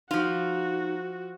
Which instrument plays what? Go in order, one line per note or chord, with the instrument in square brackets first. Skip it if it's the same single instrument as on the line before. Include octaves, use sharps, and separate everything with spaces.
[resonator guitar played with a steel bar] F3 F4 [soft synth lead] D#4 [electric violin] F#4